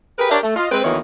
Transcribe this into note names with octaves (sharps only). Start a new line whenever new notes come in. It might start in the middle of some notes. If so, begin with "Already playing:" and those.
G4 G#4 A#4 B4
D4 G4 A#4 C#5 D5 E5
A3
F4 D#5
G#3 C4 B4
D2 D#3 E3 A#3 B3 C#5